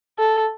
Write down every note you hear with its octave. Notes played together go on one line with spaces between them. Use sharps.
A4